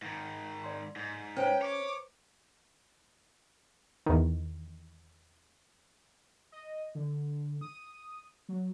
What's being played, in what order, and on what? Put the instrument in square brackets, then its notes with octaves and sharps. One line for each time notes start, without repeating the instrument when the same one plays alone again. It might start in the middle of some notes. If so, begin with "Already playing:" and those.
[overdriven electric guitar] G#2 D#3
[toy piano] D5 C6
[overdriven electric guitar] G#2
[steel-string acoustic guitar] C#4 [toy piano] B4 C5 A#5 [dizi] G5
[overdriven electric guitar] C#5 [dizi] D6
[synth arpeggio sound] E2 D#3
[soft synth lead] D#5
D3
D#6
F#3